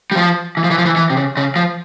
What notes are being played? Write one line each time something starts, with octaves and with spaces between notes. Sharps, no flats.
G3
F3
E3
F3
E3
F3
E3
E3
C3
C#3
C#3
F3